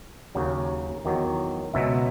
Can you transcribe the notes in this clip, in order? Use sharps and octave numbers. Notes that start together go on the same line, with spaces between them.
D#2 C#3 F#3
E2 D#3 F#3
C#2 B2 F#3 E5